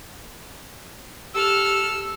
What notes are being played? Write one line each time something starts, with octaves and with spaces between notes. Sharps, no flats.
G4 A4 E6 F6